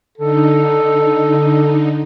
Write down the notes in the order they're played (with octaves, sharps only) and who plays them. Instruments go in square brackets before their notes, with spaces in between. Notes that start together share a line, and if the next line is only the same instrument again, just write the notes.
[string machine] D3 D#4 [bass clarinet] A4